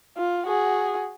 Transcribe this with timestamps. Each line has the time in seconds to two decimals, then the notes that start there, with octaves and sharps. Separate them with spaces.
0.17 F4
0.46 F#4 G#4